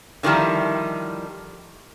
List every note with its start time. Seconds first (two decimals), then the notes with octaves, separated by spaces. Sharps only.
0.23 D3 D#3 F3 G3 E4